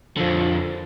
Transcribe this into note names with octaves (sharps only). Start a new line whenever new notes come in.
F2 D3 F3